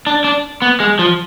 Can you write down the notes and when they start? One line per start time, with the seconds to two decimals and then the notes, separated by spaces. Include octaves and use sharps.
0.07 D4
0.24 D4
0.62 B3
0.80 G#3
0.99 F3